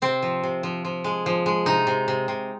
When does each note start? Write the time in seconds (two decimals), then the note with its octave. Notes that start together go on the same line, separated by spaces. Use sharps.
0.02 C3 C4
0.22 F3
0.43 C3
0.63 F3
0.85 F3
1.04 G#3
1.26 F3
1.46 G#3
1.66 C3 D#4
1.87 C3
2.08 C3
2.28 C3